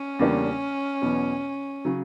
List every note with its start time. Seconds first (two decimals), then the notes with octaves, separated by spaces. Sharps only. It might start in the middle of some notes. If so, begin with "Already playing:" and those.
Already playing: C#4
0.19 E2 C#3 G3 A#3 D4
1.02 E2 B2 F#3 B3 F#4
1.85 C#3 F#3